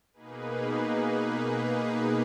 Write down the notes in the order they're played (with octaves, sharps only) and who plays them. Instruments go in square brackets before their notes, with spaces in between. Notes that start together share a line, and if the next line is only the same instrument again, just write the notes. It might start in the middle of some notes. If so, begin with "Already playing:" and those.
[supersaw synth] B2 A#3 D#4 G#4 B4